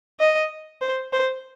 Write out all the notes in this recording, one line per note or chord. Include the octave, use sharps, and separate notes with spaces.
D#5
C5
C5